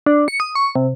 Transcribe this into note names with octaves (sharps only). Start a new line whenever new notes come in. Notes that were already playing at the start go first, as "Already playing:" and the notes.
D4
C#7
D#6
C#6
C3